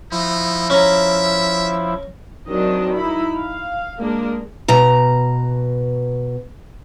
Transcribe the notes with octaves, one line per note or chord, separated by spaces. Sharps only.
F3 D#4 E4
C#4 E5 A#5
D#3 F#3 C4 D4 D#5
D#4 E4 B5
F5
G#3 A#3 D4 A#4
B2 A#5